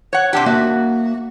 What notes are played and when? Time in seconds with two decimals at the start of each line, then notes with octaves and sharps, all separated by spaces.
0.13 C#5 F#5
0.33 C3 D4 G4
0.46 A#3 F#4 E5 F#5